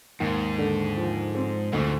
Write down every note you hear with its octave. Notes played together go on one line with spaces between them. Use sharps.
D#2 G#2
D3
F3
C4
D2 G#2